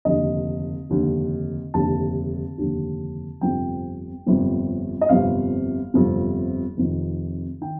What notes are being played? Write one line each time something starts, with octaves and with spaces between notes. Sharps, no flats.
F1 D#2 D3 D#5
F1 D#2 D3
F1 D#2 D3 A5
F1 D#2 D3
G1 F2 C3 G5
G1 F2 C3
D#5
G1 F2 C3 F5
G1 F2 C3
F1 F2 D#3
D#3 G5